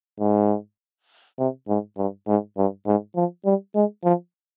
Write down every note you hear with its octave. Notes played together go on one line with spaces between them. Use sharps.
G#2
C3
G#2
G2
G#2
G2
G#2
F3
G3
G#3
F3